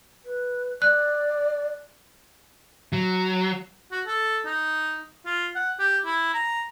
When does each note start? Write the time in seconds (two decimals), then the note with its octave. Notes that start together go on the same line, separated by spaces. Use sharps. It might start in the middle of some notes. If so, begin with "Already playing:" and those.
0.25 B4
0.82 D5 F#6
2.92 F#3
3.92 F#4
4.06 A4
4.45 D#4
5.26 F4
5.55 F#5
5.79 G4
6.05 E4
6.34 A#5